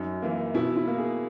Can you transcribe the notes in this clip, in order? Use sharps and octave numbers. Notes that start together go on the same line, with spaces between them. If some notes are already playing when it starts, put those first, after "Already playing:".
Already playing: F#2 D#4
E3 A#3
B2 E4
E4
A#3
G#4